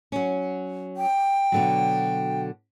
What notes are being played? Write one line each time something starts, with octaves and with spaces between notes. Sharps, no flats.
F#3 C#4
G5
B2 D3 F#3